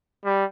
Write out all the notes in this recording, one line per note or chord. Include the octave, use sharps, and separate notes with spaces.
G3